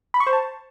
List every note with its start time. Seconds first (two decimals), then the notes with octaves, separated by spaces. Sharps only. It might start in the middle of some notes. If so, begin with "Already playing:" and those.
0.14 B5
0.20 C#6
0.27 C5
0.33 A5